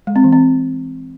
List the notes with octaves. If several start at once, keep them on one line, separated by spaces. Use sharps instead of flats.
G#3
C4
E3
C4